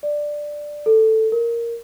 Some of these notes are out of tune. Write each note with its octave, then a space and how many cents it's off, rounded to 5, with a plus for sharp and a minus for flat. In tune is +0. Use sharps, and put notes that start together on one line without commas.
D5 +5
A4 +5
A#4 +0